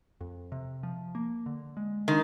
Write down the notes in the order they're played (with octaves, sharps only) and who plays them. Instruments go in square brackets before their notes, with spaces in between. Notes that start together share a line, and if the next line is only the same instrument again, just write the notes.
[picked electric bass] F2
C3
F3
A#3
D3
G#3
[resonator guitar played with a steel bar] D#3 [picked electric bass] D4